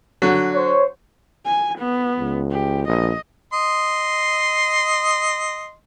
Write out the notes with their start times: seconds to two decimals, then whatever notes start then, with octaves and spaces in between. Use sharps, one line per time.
0.22 D3 F#3
0.54 C5 C#5
1.45 G#5
1.79 B3
2.19 C#2
2.51 G4
2.88 A#1 D#5
3.53 D#5 C6